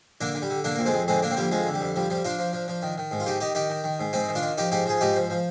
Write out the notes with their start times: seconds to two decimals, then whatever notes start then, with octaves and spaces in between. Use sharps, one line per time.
0.21 D3 A#3 D4
0.35 D3
0.42 G3
0.50 D3
0.64 D3 A#3 D4
0.75 F2 A#3
0.86 G#3 C4
0.93 F2
1.08 D3 G#3 C4
1.22 D3 A#3 D4
1.31 C4
1.37 F3 G3 A#3
1.51 F2 F3 G#3
1.66 D3
1.74 G3
1.81 F2
1.96 F3 G3
2.10 F3 G3
2.24 F3 D4 F4
2.39 F3
2.53 F3
2.68 F3
2.82 D#3
2.98 D#3
3.11 G#2
3.20 F4
3.26 D#3 D#4 G4
3.40 D#3 D#4 G4
3.55 D#3 D#4 G4
3.70 D#3
3.84 D#3
3.99 G#2
4.13 G#2 C4 D#4
4.29 D#3
4.35 D4 F4
4.43 D#3
4.58 F3 D#4 G4
4.72 G#2 D#4 G4
4.86 F3 G#4
5.01 G#2 D#4 G4
5.16 F3
5.30 F3